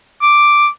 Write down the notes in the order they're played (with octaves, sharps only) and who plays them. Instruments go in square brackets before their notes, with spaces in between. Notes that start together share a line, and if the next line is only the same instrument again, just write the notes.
[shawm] D6